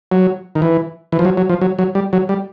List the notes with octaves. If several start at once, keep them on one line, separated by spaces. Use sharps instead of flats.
F#3
D#3
E3
E3
F3
F#3
F#3
F3
F#3
F#3
G3
F#3
G3